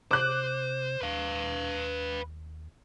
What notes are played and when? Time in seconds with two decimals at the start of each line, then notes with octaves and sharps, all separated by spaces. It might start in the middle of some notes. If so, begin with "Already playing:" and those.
0.11 C3 C5 D6 F#6
1.02 D#2 B4 F5